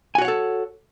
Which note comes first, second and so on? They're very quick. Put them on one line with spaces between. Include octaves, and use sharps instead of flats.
G#5 F#4 C#5 F#5 A4